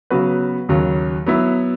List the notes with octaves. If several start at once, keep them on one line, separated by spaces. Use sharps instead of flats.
C#3 F#3 B3 F#4 B4
D#2 C#3 F#3
F#3 B3 E4